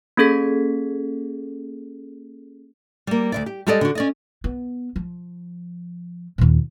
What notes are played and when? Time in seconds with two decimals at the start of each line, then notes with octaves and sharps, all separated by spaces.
0.17 A#3 C#4 G#4 A4 G#6 B6
3.07 G3 A#3
3.32 D2 A#2 D5
3.46 G4
3.67 G3 G#3 G4 A4 D5 D#5
3.81 D3 F#4
3.95 C#4 D5 D#5
4.44 B3
4.96 F3
6.38 D#2 A#2